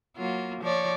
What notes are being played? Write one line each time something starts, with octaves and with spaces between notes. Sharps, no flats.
F#3 A#3 F4
F3 C#5 D5